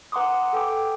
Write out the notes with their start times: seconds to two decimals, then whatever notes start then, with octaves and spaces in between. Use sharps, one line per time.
0.12 B4 F#5 A#5 C6 D6 D#6
0.53 A4 G5 G#5 D6